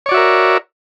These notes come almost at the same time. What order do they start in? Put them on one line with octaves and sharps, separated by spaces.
C#5 D5 F#4 E5 A#4